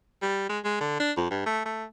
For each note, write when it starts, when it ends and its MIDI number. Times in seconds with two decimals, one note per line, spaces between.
0.22 0.48 55
0.49 0.59 56
0.64 0.77 56
0.80 0.98 50
1.00 1.12 62
1.17 1.27 41
1.30 1.43 43
1.46 1.60 57
1.65 1.84 57